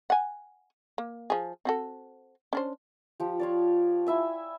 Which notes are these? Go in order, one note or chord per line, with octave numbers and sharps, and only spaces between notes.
F#5 G#5
A#3
F3 G#4
C4 F#4 A4
C#4 D4 C5
F3 G4
F4 C#5 D5
E4 E5 G#5